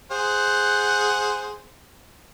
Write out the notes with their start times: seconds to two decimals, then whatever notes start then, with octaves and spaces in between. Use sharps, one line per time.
0.11 G#4 C5 F#5